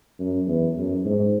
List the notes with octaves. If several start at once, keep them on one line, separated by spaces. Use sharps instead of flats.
F#2
E2
F#2
G#2